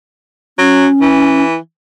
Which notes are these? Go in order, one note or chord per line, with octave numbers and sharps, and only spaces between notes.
F#3 C#4
E3